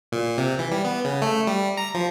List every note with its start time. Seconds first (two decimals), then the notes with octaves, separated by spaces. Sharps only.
0.12 A#2
0.38 C3
0.59 E3
0.71 G3
0.85 B3
1.05 C#3
1.22 A3
1.47 G3
1.77 A#5
1.94 F3